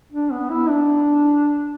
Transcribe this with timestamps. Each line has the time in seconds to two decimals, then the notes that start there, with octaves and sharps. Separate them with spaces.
0.12 D4
0.32 B3
0.50 E4
0.70 D4